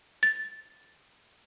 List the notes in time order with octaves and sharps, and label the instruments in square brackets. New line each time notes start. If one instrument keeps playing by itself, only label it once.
[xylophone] A6